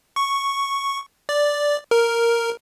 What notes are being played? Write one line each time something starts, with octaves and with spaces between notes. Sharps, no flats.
C#6
D5
A#4